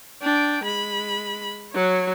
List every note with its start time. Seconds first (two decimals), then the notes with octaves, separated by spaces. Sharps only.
0.22 D4 G5
0.64 G#3 B5
1.72 F#3 C#5